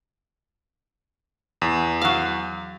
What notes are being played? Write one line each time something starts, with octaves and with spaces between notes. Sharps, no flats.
E2
F#3 F5